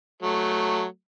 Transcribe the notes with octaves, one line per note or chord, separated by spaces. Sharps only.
F#3 A3